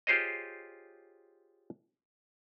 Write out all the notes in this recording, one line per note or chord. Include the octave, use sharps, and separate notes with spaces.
F4 G4 G#4 C5 C#5 D#5